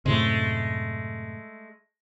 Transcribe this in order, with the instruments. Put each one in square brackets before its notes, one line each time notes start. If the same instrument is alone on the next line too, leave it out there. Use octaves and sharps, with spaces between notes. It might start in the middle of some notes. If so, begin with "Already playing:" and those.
[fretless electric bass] F#2 A2 C3 [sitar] G#3 A3